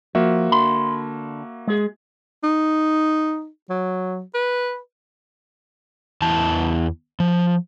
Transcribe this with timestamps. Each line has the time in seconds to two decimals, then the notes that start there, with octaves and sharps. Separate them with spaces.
0.15 F3 A#3 F#4 E5
0.52 D3 B5 C6
1.67 G#3 G#4
2.43 D#4
3.69 F#3
4.34 B4
6.22 E2 E3 A5
7.20 F3